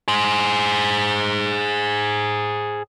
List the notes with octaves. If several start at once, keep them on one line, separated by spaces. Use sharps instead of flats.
G#4 C5